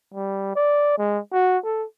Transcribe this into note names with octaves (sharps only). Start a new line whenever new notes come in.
G3
D5
G#3
F#4
A4